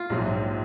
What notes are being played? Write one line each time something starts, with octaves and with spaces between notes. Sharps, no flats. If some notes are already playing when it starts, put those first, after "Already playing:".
Already playing: F4
A#1 G#2 F#3